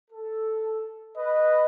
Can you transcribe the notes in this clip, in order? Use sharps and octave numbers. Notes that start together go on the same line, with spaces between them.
A4
B4 D#5